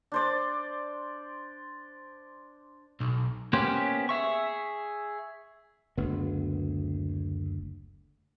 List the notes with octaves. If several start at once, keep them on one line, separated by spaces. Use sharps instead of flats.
D4 C5 D5
B1
A#3 B3 C#4 G4 C5
G#4 E5 C#6
F#1 D2 B3